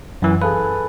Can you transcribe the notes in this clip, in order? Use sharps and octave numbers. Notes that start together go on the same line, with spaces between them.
F#2 E3
G#4 A4 B4 F5